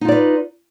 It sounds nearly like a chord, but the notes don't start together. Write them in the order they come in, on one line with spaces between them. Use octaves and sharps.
D#4 F4 D5 B4